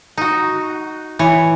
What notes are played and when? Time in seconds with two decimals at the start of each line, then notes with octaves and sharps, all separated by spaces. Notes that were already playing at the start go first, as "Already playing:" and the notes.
0.17 D#4 F#4
1.19 E3 C#5